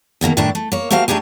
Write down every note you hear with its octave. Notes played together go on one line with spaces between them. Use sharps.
D#2 B2 D#3 A#3
A2 D#3 G3 A3 D4 E4
A3
A#3 C#5
A3 A#3 F#4 G4 C5 F5
A3 D4 D#4 G4 G#4